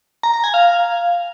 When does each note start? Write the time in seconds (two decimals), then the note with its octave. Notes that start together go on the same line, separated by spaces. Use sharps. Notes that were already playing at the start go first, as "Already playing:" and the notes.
0.23 A#5
0.34 A#5
0.44 G#5
0.54 F5